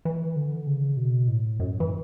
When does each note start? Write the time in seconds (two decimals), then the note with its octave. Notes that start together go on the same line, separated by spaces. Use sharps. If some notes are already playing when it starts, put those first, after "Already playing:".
0.05 E3
0.36 D3
0.67 C#3
0.97 B2
1.28 A2
1.60 F#2
1.80 E3